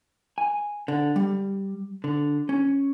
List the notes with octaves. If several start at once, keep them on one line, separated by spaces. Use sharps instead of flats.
G#5
D3
G3
D3
C#4